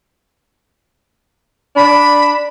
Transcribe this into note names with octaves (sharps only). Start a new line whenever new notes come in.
D4 B5